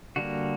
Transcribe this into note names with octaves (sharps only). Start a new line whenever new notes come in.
D3 G3 A#3 F#4